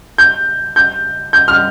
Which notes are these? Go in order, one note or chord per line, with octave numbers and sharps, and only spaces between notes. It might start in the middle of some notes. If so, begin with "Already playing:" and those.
G6
G6
G6
F6